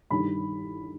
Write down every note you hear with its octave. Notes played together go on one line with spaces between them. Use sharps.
G2 D#3 G3 B5